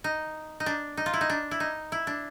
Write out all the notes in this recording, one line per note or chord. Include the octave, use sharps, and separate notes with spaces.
D#4
D#4
D4
D#4
F4
E4
D#4
D4
E4
D#4
E4
D4